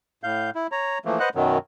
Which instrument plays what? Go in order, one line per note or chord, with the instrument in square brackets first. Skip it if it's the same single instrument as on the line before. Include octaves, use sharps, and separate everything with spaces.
[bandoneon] A2 F5 G6
E4
C#5 A#5
E3 F3 A3 A#3
B4 C5 D#5 F#5 F#6
F#2 B2 D#3 F#3